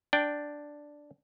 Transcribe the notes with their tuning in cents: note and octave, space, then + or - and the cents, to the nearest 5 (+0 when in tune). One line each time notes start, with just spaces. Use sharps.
D4 +0 G5 +0